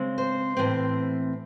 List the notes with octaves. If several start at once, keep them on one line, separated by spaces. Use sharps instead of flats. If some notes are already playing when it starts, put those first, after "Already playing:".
Already playing: C#3 G#3 C4
C5
A2 E3 C4